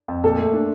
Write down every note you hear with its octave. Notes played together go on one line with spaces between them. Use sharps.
F2
A#2 A4
A3
D4